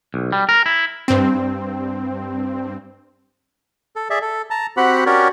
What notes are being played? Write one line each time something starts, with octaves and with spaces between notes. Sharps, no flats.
B1
G3
A#4
E4
G2 C4
A4
G#4 D5 E5
A4
A5 A#5
C4 F#4 G4 F#5 B5
C#4 F#4 G4 A#4 C#5 D5